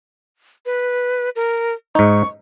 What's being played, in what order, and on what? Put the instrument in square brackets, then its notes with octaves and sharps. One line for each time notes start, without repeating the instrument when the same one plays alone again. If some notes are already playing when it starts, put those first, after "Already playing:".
[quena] B4
A#4
[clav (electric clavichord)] G#2 D#4 [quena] C#6